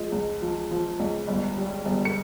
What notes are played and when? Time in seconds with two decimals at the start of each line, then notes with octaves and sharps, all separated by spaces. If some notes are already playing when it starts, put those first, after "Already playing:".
Already playing: F3 G#3
0.12 C#2
0.42 F3
0.71 F3
1.00 C#2
1.28 G1
1.58 G3
1.85 G1
2.05 C#7